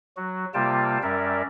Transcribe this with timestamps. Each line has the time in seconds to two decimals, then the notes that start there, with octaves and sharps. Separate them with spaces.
0.17 F#3 F#4
0.54 C3 G3 A#3 F4 G5 A5
1.03 F#2 G3 C#4 A#4 D5 E5